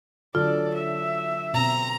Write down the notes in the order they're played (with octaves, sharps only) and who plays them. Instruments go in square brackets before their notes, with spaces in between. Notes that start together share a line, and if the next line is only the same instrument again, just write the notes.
[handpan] D3 F#3 A4 [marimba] F4 [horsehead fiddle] D5
[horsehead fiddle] E5
[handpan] B2 C4 [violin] A#5